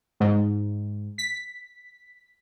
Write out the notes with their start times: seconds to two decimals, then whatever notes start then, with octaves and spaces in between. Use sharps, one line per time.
0.20 G#2
1.18 B6